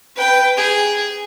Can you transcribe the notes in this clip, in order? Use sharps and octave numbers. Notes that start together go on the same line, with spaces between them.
B4 G5
G#4